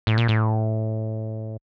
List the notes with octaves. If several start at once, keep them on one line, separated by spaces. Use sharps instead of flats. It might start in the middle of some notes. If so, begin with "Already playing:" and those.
A2
A#2
A2